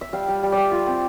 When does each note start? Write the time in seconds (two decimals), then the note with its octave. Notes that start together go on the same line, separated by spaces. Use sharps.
0.01 E5
0.13 G3 F5
0.28 G3
0.43 G3
0.52 D5
0.57 G3 E5
0.71 F4
0.87 C4